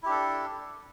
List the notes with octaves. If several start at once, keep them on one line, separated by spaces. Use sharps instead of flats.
D4 E4 G4 A4